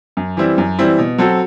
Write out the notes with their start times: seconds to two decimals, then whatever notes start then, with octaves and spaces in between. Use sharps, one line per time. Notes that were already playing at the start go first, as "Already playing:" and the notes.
0.17 F#2
0.37 E3 G3 C4 E4
0.58 F#2
0.79 E3 G3 C4 E4
0.98 B2
1.18 F#3 C4 F#4 A4